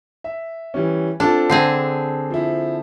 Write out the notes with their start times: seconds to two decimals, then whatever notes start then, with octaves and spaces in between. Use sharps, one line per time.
0.24 E5
0.74 E3 G3 C#4
1.20 C4 D4 F4 A4
1.50 D3 C4 G#4 C7
2.30 F3 E4